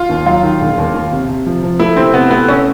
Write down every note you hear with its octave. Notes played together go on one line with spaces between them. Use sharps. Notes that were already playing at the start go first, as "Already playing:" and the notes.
Already playing: F4
D#2
F#3 F4
D#3
E1
D#2
D#2
C3
C3
F3
F3
A3 E4
C3 C4
C3 B3
A3 B3
C#4